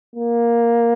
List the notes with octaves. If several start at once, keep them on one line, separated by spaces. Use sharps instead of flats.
A#3